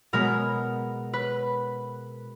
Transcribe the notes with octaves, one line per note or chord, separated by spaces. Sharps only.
B2 G#3 B3 A#4
B4